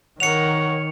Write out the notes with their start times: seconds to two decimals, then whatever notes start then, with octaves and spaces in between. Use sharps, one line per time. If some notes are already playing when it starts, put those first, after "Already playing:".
0.20 D#3 A#4 C#5 F#5 C#7 F7